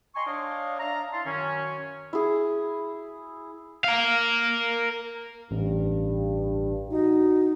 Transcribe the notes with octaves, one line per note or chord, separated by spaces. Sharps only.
D#5 G5 G#5 A#5 C6 C#6
D4 C#5 D#5 F5
D4 E5 F5 A5 A#5
E4 F5 A5 C6
F#2 D#3 C#4
E4 G#4
A#4 F5
A1 G2
D#4 F#4